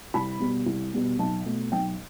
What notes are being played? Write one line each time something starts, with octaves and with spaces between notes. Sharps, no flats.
C2 B5
B2 G3 B3
C2
B2 G3 B3
B1 A5
B2 A3
B1 G5